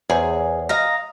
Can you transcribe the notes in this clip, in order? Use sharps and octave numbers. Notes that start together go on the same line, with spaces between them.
E2 G#4 C5 C#5
D#5 F5 A#5